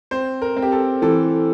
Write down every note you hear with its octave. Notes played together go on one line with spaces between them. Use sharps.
C4 C5
A#4
C4
G4
A4
E3 A4